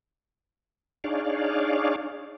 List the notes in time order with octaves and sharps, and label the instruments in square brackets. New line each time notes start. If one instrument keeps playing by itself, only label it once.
[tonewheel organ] D4 D#4 G#4 C#5 D5 F5